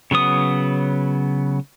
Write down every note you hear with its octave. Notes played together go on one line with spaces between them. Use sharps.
C#3 F#3 B3 D#6